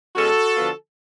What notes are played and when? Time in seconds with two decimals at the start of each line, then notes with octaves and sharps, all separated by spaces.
0.16 B2 G#3 C#4 F#4 A4
0.56 D3 F3 B3 F4